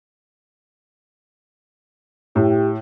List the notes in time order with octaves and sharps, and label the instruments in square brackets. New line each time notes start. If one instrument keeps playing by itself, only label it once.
[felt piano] A2 [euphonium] G4